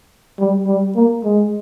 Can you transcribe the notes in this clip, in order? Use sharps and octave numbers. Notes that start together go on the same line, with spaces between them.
G3
G3
A#3
G#3